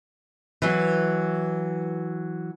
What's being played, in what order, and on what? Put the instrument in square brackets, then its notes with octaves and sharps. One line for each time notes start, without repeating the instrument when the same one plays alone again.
[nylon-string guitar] E3 F#3